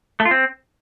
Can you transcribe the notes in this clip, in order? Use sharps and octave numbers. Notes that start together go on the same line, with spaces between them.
A3
F4
C4